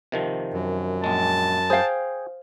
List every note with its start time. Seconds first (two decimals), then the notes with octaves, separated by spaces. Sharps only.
0.12 C3 D#3 F3
0.53 F#2
1.04 A#1 G#3 A5
1.70 G#4 C5 F5 G5